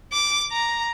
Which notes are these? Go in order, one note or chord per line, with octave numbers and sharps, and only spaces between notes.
D6
A#5